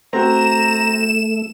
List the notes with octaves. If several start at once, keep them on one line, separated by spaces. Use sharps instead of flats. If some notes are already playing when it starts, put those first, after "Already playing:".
A3 C4 F#4 A#5 E7